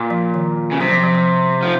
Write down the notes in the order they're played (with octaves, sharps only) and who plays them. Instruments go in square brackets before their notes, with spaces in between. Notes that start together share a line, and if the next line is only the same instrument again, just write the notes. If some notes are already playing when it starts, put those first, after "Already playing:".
Already playing: [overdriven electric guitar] A#2
[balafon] F3
D#3
[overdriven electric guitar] C#3
[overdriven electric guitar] C3 [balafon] F#3
[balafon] F3
F3
F3
[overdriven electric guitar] F3